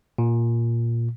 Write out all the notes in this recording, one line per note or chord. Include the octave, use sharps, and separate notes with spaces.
A#2